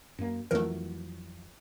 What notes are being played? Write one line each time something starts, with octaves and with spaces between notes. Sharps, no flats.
F#2 A#3
F2 E3 F#3 A3 A#4